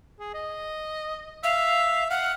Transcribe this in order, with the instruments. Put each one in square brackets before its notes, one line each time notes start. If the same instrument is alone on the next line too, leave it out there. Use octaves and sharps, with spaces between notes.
[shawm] G#4
D#5
[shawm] E5 [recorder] F5
[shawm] F5 [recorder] F#5